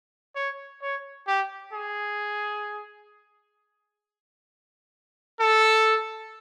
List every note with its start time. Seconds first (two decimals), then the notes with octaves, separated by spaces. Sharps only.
0.35 C#5
0.82 C#5
1.27 G4
1.73 G#4
5.40 A4